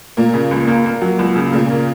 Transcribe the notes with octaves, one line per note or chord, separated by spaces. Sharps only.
A#2 A#3
C#3
C#2
A#3
A#3
F#3
C#2
C#3
A#2 C#3
A#3